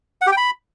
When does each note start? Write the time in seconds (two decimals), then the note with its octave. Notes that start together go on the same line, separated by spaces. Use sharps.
0.21 F#5
0.27 G4
0.32 G5
0.37 B5